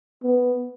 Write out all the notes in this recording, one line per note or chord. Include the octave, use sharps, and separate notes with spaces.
B3